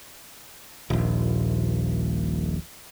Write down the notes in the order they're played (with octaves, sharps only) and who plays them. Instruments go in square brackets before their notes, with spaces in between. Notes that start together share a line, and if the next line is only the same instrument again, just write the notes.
[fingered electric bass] D#1 A#1